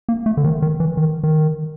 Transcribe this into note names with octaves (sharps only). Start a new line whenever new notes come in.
A#3
A3
D3
D#3
D#3
E3
D#3
D#3